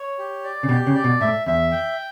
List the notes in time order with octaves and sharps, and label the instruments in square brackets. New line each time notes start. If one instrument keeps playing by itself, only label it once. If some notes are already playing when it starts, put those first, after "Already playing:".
Already playing: [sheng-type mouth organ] C#5
G4
D5
[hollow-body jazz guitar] C#3
[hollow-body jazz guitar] B2 [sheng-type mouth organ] G4
[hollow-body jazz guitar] C#3
[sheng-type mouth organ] D5
[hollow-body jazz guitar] B2
[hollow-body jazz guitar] A2 [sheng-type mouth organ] E5
[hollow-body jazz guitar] E2 [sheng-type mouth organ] E5
[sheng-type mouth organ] G5